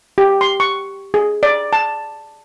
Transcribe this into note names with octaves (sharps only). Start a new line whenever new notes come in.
G4
C6
C#6
G#4
D5
A5